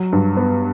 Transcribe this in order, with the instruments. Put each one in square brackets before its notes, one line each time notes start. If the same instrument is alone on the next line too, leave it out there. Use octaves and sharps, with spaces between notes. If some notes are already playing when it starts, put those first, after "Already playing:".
Already playing: [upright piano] F#3
G2
B3